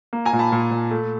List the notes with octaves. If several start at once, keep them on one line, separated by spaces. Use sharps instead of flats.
A#3
G#5 A#5
A#2
A5 B5
A#2
A#2
A3